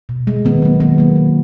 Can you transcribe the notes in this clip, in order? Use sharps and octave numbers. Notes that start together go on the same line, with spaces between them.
B2
G#3
D#3 B3
F#3 A#3
D#3 B3
F#3 A#3
D#3